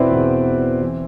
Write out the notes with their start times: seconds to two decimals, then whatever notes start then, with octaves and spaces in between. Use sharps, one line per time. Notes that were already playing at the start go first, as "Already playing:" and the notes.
Already playing: E2 B2 C4 E4 B4 C5 D5 E5
0.11 E2 B2
0.82 E3